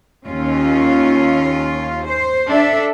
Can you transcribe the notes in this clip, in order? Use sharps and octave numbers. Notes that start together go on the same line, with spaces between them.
D#2 C#4 F4
C5
D4 A4 E5